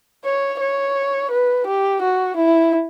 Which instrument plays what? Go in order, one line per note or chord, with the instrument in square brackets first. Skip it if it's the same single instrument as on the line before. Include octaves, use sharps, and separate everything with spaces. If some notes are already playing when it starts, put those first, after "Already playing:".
[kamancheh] C#5
C#5
B4
G4
F#4
E4